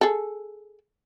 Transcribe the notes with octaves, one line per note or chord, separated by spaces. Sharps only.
G#4 A4